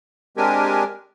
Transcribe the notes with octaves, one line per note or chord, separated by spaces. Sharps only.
G#3 C4 D4 G4 A#4 G#5